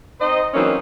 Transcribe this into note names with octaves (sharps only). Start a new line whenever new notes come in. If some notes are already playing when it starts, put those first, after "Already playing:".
C4 D#4 C5 D#5
E3 F#3 A#3 C4 C#4 D#4